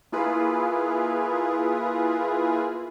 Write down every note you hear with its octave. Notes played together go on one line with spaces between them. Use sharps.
A#3 E4 F4 G#4 B4